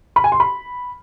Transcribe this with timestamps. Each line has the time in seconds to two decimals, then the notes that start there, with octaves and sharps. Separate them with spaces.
0.16 B5
0.24 G#5
0.32 C6
0.40 B5